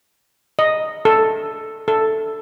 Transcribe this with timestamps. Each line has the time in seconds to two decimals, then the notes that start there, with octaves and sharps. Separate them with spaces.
0.59 D#5
1.05 A4
1.88 A4